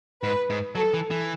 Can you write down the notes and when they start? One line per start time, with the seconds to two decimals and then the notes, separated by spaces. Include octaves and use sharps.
0.22 G#2 B4
0.50 G#2
0.75 F#3 A4
0.94 E3
1.11 E3